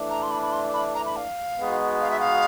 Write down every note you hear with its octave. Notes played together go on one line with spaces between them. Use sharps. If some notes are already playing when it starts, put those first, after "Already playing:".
Already playing: E3 A3 D4
A#5
C6
B5
B5
C6
B5
A#5
B5
F5
B2 G#3 B3 D#4 F#4
F5
E5
F5